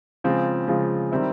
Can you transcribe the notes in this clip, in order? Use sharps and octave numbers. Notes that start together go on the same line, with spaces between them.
C#3 F3 G#3 C4 F4
C#3 F3 G#3 C4 F4
D#3 G3 C4 E4